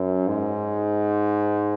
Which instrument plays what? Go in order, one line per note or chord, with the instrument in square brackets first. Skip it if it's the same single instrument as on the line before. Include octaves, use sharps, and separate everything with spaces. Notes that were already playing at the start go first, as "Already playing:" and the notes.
Already playing: [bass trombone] F#2
G#2